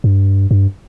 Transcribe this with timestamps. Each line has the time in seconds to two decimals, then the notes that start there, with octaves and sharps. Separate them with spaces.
0.04 G2
0.51 G2